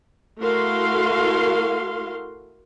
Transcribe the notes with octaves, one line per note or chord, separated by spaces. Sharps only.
A3 E4 F#4 A#4 F5 C6